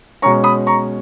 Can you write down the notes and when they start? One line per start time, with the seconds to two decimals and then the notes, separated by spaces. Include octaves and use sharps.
0.22 B2 G#3 C#4 A#5 C#6
0.44 B5 D#6
0.67 A#5 C#6